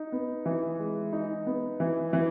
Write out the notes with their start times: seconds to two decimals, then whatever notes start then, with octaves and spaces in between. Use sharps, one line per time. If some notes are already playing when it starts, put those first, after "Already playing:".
Already playing: D#4
0.12 B3
0.46 E3
0.79 G#3
1.13 D#4
1.46 B3
1.80 E3
2.13 E3